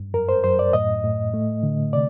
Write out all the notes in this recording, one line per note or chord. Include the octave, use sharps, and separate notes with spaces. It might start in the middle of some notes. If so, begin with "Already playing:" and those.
Already playing: G2
F#2 A#4
C5
F#2 C5
D5
A2 D#5
A2
A3
D3
C3 D5